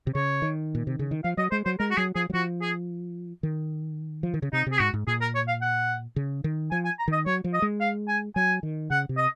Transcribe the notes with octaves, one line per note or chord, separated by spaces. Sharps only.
C3
C#3 C#5
D#3
A#2
C3
C#3
D#3
F3 F5
F#3 D#5
G#3 C5
F#3 C5
G#3 A#4
F#4
F#3 G#4
F3 G#4
F#3
F3 F#4
G#4
D#3
F3
D#3
C#3
C3 D#4
C3
G#4
G#2 F#4
G#2
A#2 G#4
A#4
C#5
F5
F#5
C#3
D#3
F3 G#5
G#5
A#5
D#3 D#5
F#3 C#5
F3
D#5
G#3
F5
G#5
F#3 G#5
D#3
C#3 F#5
C3
D#5